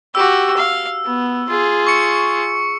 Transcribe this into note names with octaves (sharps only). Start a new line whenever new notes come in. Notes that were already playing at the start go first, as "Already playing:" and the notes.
F#4 G4 E6
F5
B3
F4 G#4
C#6 C#7